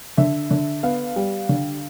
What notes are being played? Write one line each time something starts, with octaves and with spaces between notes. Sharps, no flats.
D3 E5
D3
B3 F5
G3
D3